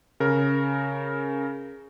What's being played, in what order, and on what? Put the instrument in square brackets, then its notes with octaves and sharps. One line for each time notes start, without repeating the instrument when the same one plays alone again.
[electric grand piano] C#3 A#4